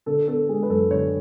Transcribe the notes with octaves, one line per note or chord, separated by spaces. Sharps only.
D3 A4
B3 A4
G#3 G#4
B4
F#2 A4
D3 C#5